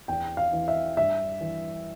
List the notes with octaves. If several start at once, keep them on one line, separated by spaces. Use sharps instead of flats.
E2 G5
F5
E3
E5
G2 E5
E3